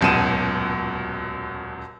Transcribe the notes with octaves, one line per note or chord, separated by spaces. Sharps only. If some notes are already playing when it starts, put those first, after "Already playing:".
D#1 C#2 F#2 B2 D#7 E7